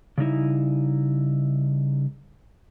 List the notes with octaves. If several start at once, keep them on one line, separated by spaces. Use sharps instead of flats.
C#3 G3 D#4 E4